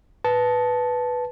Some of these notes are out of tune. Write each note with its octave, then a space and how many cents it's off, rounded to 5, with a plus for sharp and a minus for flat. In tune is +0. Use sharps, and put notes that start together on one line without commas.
B4 +0 A5 -10